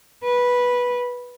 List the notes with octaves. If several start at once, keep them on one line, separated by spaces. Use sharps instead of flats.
B4